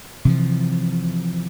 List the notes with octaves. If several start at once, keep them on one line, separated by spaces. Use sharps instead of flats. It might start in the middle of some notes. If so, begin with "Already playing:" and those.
C3 E3 F3